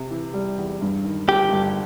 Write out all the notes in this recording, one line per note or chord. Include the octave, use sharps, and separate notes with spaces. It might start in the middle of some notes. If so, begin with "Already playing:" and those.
Already playing: C3
E3
G3
E2
G2
D#3
G1 G4
G1